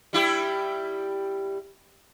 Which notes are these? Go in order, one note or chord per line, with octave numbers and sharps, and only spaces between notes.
G3 E4 G4